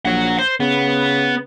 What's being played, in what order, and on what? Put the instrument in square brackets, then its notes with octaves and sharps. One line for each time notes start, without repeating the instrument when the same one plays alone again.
[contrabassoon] A#1 [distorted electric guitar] C#5 F#5
[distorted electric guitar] C5
[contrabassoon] C#3 [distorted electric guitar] B3